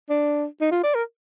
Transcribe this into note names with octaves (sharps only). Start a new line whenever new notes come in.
D4
D#4
F4
D5
A#4